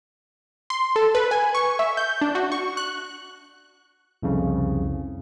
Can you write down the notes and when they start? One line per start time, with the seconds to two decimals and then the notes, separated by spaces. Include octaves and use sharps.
0.70 C6
0.96 A4
1.15 B4
1.31 G#5
1.55 C#6
1.79 E5
1.97 G6
2.21 D4
2.35 F#4
2.52 C#6
2.77 F#6
4.23 C2 F2 C#3